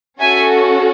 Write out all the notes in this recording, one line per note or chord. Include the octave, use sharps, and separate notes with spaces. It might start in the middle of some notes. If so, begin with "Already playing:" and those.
C#4 F#4 A4 E5 G#5